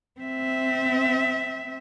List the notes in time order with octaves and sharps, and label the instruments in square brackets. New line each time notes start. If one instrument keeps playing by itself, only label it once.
[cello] C4 E5